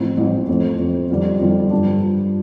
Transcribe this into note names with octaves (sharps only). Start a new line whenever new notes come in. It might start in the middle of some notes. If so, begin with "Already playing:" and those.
Already playing: A1 A2 F3 C4
A1 A2 F3 C4
F2 F3 C4
F2 F3 C4
F2 D3 G3 F4
F2 D3 G3 F4
G2 F3 D4